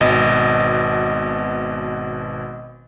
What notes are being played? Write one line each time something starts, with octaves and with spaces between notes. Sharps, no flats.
G#1 B2 D#5